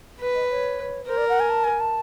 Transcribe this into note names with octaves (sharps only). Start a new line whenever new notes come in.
B4
D#5
D5
C#5
A#4 C5
D5
F#5
G#5
A5
G#5
A5